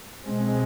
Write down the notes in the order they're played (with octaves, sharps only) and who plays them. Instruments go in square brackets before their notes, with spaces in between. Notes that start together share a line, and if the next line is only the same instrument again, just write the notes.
[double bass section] B2 G#3 C4